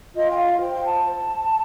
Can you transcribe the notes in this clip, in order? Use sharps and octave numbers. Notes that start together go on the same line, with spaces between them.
F4 D#5
G5
F5
C5 G5
G5
A5